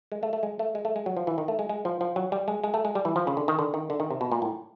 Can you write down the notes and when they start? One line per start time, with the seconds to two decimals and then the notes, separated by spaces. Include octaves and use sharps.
0.12 G#3
0.23 A3
0.33 A3
0.43 G#3
0.59 A3
0.75 G#3
0.85 A3
0.96 G#3
1.06 F#3
1.17 F3
1.27 E3
1.38 D#3
1.48 A3
1.59 G#3
1.69 G#3
1.85 F3
2.01 F3
2.16 F#3
2.32 G3
2.48 G#3
2.63 G#3
2.74 A3
2.85 G#3
2.95 G3
3.05 E3
3.16 F3
3.27 C#3
3.37 D3
3.48 D#3
3.59 D3
3.74 D#3
3.90 D3
4.00 D#3
4.11 C3
4.21 B2
4.32 A#2
4.42 A2